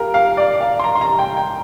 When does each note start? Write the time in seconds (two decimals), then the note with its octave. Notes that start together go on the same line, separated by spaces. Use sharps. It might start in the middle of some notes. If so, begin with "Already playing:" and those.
Already playing: F4 G4 A#4
0.14 F5
0.37 D5
0.61 F5
0.79 C6
0.84 A#5
0.95 C6
1.01 A#5
1.19 G5
1.36 G5